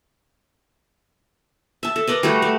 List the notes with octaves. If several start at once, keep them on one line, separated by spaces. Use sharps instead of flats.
E5 A5
A4
A#4 B4 D5 D#5
G3 A3 F#4 G4
A3